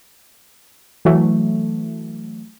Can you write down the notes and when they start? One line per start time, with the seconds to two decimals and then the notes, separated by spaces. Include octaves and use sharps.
1.05 E3 F#3 A3